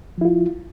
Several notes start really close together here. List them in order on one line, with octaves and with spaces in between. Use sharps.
F3 E4 F4